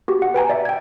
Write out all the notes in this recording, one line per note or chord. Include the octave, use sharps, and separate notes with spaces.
F#4 G4
F#5
B4 G5 G#5 A#5
D5 E5
G5 G#6